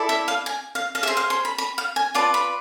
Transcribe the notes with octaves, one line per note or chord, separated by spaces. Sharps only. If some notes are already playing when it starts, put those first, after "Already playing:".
Already playing: E4 A4 D5
E5
F5
G#5
F5
F5
G#4 C5 E5
F5
C6
B5
B5
F5
G#5
F4 B4 D5 A5
B5